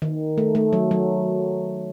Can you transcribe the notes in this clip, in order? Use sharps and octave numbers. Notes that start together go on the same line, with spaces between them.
D#3
A3
A3
F#3
F#3